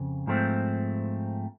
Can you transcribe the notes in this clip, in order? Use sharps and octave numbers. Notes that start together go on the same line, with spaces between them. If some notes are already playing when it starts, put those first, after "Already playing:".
Already playing: F2 C#3
G#2 F3 A3 C4